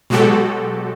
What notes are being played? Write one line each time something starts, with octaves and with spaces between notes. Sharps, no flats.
B2 F#3 G#3 F#4 G4 A4